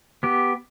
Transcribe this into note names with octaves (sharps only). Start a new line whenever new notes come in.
B3 G4